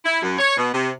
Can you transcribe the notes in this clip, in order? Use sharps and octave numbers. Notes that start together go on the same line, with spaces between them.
E4
F#2
C#5
B2
C3